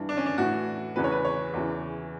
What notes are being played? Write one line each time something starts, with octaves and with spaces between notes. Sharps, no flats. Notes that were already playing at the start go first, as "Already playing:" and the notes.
Already playing: G2 E3
D4
C#4
D4
A2 E3 F#4
E2 C#3 E3 B4
C#5
B4
C#5
E2 C#3 E3